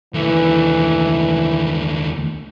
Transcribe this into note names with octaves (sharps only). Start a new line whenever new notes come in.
D#2 E3 A3